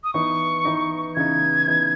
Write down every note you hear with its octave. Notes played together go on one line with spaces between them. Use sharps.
D#6
E3 B3 D#4 C#6
E3 B3 D#4
C#3 E3 B3 D#4 G#6
C#3 E3 B3 D#4